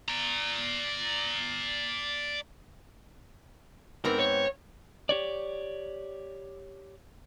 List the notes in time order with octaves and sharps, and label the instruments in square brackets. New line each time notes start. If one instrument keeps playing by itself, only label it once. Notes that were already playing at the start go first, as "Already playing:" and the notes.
[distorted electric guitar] D5 A#5
[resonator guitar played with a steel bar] G#2 B3 C4 [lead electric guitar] A#4
[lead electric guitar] C#5
[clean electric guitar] G4 C#5 D5